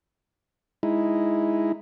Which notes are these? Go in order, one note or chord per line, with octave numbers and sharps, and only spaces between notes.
G#3 D#4 E4